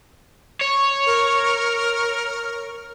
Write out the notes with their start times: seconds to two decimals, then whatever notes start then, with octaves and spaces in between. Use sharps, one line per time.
0.61 C#5
1.06 A#4